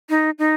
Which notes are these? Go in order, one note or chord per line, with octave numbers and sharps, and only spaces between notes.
D#4
D#4